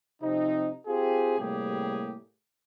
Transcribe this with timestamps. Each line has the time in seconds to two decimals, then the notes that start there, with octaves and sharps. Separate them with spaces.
0.21 C3 F3 C4 D#4
0.86 C4 F4 G4 G#4
1.39 A2 C3 G3 A#3 G4 G#4